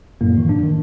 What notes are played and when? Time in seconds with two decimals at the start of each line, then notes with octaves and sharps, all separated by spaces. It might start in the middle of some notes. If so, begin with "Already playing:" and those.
0.21 F#2 A2 A#3
0.36 A2 D#3 E3
0.49 D4
0.63 D#3